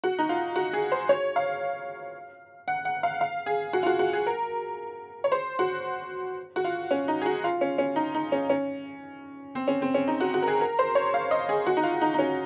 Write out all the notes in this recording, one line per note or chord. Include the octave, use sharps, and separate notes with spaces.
F#4
D#4
F4
F#4
G#4
C5
C#5
F5
F#5
F#5
F5
F5
G#4
F#4
F4
F#4
F#4
G#4
A#4
C#5
C5
F#4
F#4
F4
C#4
D#4
G#4
F#4
F4
C#4
C#4
D#4
D#4
C#4
C#4
C4
C#4
C4
C#4
D#4
F#4
F#4
A#4
G#4
A#4
C5
C#5
F5
D#5
G#4
F#4
D#4
F4
D#4
D#4
C#4